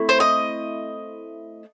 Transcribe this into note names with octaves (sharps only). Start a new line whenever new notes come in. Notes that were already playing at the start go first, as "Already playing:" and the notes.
Already playing: A3 C4 E4
C5
D#5